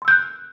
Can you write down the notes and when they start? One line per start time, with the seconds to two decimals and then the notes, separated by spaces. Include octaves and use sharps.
0.02 C6
0.05 E6
0.08 G6
0.11 F#6